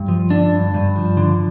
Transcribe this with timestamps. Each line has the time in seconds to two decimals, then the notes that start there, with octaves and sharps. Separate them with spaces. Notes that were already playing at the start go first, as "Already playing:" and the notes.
Already playing: G2
0.08 F3
0.30 D3 D4
0.52 G2
0.74 G2
0.96 F3
1.17 D3